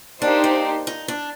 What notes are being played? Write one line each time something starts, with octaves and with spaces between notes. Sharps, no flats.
A#3 D4 D#4 G4 C5
C4
D#4
D4